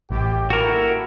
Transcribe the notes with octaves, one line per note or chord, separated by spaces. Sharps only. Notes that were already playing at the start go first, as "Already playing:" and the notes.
A1 F#2 G4
A#3 E4 F#4 A4 A#4